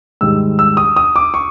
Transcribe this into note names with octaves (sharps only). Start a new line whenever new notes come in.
G#2 D#3 G3 E6
E6
D#6
D#6
D6
C#6